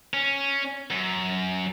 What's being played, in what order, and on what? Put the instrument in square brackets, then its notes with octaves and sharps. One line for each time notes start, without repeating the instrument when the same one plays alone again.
[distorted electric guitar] C#4
F#2